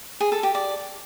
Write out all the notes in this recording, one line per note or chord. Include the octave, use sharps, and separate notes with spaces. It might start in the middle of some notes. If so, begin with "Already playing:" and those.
G#4
A4
G4
D5